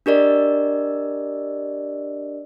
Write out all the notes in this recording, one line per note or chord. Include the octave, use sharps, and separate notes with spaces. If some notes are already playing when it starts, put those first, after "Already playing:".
D4 G4 A#4 D5 D#5